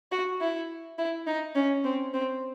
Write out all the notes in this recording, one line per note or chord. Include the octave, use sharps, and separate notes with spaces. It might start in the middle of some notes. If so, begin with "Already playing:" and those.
F#4
E4
E4
D#4
C#4
C4
C4